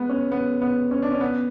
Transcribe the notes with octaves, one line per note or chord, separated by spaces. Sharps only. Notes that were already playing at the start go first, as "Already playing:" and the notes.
Already playing: G#3 B3
C#4
B3
B3
C#4
D4
C#4
B3